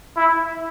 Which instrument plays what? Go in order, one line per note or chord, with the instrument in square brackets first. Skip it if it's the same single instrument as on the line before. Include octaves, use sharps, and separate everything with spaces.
[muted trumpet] E4